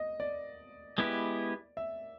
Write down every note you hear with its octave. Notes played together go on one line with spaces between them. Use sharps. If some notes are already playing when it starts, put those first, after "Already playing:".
Already playing: D#5
D5
G#3 B3 E4 G4 B4
E5